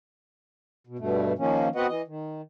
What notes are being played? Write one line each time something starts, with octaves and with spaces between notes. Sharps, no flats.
B2
G2 B2 A3
D#3 F3 A#3 C#4
B3 C4 F#4 B4 D#5 F#5
E3 D#5
D#3